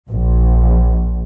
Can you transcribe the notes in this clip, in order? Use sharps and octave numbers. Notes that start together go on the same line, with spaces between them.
A#1